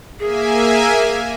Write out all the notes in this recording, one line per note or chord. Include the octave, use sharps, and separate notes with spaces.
A#3 G#4 E5 G#5